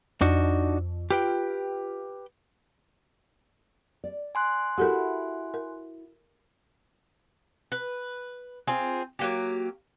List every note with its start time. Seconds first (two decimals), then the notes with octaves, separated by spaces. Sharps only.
0.21 F2 D4 D#4 F#4
1.10 F4 G4 B4 G5
4.04 D5
4.35 G#5 C6 F#6
4.78 E4 F#4 G4 A4 A#4
5.54 A#4
7.72 B4
8.67 C4 F4 G#4
9.19 F#3 A#3 G4